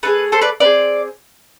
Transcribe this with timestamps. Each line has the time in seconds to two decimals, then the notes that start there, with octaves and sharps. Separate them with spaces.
0.03 A3 D4 G#4 B4
0.32 A4 C5
0.41 B4 D5
0.60 C4 G#4 B4 D5